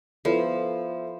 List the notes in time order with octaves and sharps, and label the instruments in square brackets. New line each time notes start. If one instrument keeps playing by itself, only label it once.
[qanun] F3 [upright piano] B3 E4 A4 C5